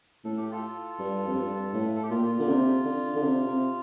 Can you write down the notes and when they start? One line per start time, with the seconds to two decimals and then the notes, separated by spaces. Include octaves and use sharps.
0.24 A2 A4
0.38 G4
0.51 F4 A4
0.99 G2
1.27 F2
1.36 G2
1.74 A2
1.96 A4
2.03 G4
2.10 A#2 F4
2.40 D3
2.48 C3
2.85 D3
3.16 D3
3.22 C3
3.46 C3